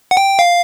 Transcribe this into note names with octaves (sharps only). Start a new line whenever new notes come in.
F#5
G5
F5